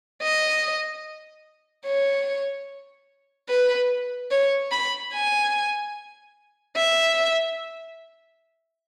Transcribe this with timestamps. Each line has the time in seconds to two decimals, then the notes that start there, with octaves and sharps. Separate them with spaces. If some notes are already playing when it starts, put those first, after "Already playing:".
0.23 D#5
1.87 C#5
3.49 B4
4.31 C#5
4.72 B5
5.13 G#5
6.77 E5